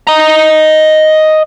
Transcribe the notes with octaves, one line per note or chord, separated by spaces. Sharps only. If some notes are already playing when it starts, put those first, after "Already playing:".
D#5 A#5